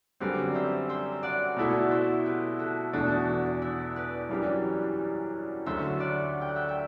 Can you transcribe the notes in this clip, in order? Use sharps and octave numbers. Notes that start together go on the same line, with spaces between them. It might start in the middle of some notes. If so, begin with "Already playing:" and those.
F#2 D3 G3 C4 B4 D5
C5 E5
C5 E5
D5 F#5
B2 A3 E4
C5 E5
G4 B4
F#4 A4
E2 B2 A3 D4 F#4
E4
B4 D5
F#2 E3 G3 D4 G4
D2 D3 F#3 A3 C5 E5
D5 F#5
G5
F#5
E5 G5
E5 G5